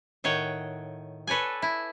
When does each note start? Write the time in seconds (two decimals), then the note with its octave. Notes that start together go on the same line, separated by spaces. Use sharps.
0.24 A2 D#3 C#5 F#5 G5
1.27 A4 B4 C#5 D5 G#5
1.62 E4